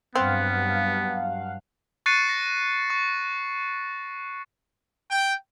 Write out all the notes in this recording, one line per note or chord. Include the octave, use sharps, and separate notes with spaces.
G2 F#3 B3 C4 F5 F#5
C#6 F#6 A6 C7 C#7 D#7
A#6
C#6
G5